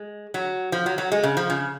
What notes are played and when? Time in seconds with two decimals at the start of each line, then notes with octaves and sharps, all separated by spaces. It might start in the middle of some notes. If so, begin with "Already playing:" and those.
Already playing: G#3
0.34 F#3
0.72 F3
0.86 F#3
0.98 F#3
1.12 G#3
1.23 C#3
1.37 F3
1.50 C#3